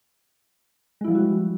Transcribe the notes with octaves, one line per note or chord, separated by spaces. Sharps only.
F3 G3 G#3 E4 F#4